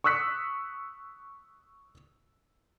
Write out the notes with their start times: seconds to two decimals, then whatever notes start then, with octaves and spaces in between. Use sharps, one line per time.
0.04 C#6 D#6 E6 F#6 B6 C#7